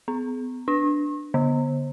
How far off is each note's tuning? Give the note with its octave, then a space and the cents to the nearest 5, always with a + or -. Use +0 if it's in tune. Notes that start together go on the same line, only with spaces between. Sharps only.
B3 +35
D4 +0
D3 -30